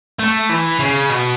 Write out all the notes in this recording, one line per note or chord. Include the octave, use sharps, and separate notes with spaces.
A3
E3
C#3
B2